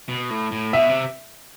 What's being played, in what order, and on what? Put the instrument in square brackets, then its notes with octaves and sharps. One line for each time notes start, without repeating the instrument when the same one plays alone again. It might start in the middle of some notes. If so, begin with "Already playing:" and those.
[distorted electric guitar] B2
A2
A2
[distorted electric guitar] B2 [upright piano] E5
[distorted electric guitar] C3